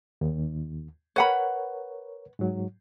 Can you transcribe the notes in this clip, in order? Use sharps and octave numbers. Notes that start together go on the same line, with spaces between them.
D#2
A#4 B4 C#5 F#5 B5
G#2 F#3